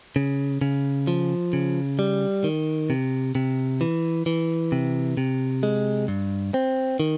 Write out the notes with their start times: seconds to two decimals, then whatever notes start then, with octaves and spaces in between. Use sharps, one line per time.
0.16 C#3
0.61 C#3
1.07 F3
1.53 C#3
1.99 G3
2.44 D#3
2.90 C3
3.35 C3
3.81 E3
4.26 E3
4.72 C3
5.17 C3
5.63 G#3
6.08 G2
6.54 C4
7.00 D#3